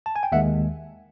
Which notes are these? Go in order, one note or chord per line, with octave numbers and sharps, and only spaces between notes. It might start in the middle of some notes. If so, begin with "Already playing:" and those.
A5
G#5
G5
D#2 D#3 G#3 E5 F#5